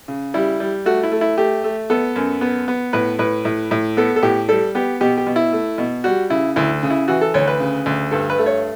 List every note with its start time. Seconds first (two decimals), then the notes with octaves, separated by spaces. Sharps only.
0.08 C#3
0.34 G3 E4
0.60 G3
0.86 A3 F#4
1.03 E4
1.11 A3
1.21 E4
1.38 A3 G4
1.64 A3
1.90 B3 A4
2.16 F#2
2.41 B3
2.68 B3
2.93 A2 B4
3.19 A2 B4
3.45 A2
3.71 A2
3.97 B3 A4
4.16 A4
4.22 A2 G4
4.49 G3 A4
4.75 B3 G4
5.01 B2 G4
5.18 G4
5.27 B2
5.36 E4
5.52 A3
5.78 B2
6.04 G3 F#4
6.30 C#3 E4
6.56 D2 E4
6.83 C#3
6.90 E4
7.08 E3 F#4
7.21 A4
7.34 D2 C#5
7.48 B4
7.60 C#3
7.86 D2
8.11 G2 A4
8.30 B4
8.38 A3
8.46 C#5